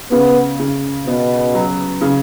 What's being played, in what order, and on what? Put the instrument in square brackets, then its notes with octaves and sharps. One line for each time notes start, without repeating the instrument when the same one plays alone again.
[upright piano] C#3 [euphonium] B3
[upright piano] C#3
[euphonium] B2 [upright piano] B3
[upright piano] F#3
C#3